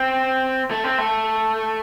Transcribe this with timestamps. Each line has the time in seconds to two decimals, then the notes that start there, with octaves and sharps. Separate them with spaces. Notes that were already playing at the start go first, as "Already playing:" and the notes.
Already playing: C4
0.71 A3
0.84 C4
0.98 A3